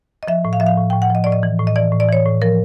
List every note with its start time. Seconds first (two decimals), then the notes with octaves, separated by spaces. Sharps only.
0.23 D#5
0.28 F3 E5
0.45 A2
0.53 F5
0.60 F3 E5
0.67 F5
0.77 A2
0.90 A2 G5
1.02 F#5
1.10 F3 D#5
1.24 A2 D5
1.32 D#5
1.43 E3
1.59 A2
1.67 D#5
1.76 E3 D5
1.92 A2
2.00 D5
2.09 E3 C#5
2.26 A2
2.42 F3 A#4